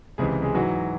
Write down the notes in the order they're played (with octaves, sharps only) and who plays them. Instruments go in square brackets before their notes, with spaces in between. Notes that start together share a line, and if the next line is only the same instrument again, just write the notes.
[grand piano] C#2 C3 E3 G#3 G#4
G#3 G#4
G#2 E3 F#3 F#4